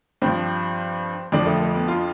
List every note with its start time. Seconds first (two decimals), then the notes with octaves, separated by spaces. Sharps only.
0.22 G2 F3 C4
1.32 F2 D3 F3 D4
1.46 A3
1.61 A3
1.75 B3
1.88 F4